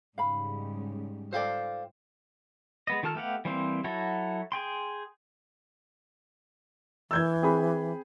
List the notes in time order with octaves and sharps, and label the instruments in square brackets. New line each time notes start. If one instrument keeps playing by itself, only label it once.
[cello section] G#2 C#3 G3 [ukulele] F5 B5
[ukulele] F4 A4 D5 [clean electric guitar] C5 F5 G5
[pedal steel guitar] G#3 B3 D#5
D#3 F4 A4 A5 F6
A3 B3 G4 F5 F#5
E3 G3 A#3 C4 C5
F#3 E4 F#4 A4
G#4 G5 C6
[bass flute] E3 [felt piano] E6 G6 G#6
[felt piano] C4 G#4 B5